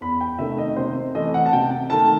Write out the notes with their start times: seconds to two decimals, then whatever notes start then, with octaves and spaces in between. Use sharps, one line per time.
0.01 E2 B5
0.21 G5
0.39 C3 D#3 A3 E5
0.58 D#5
0.76 C3 C5
1.15 E3 A3 C4 D#5
1.34 F#5
1.46 A5
1.53 C3 G5
1.90 D#3 A3 A5